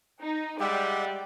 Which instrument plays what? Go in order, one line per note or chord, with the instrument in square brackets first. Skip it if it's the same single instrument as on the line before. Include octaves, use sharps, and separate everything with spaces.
[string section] D#4
[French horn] G3 [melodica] G#3 E5 F#5 [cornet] G4 [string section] D5 G5